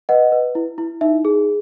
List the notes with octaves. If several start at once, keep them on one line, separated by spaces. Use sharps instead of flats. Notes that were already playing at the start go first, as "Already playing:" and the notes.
B4 D#5 F#5
B4
E4
E4
D#4 E5
G#4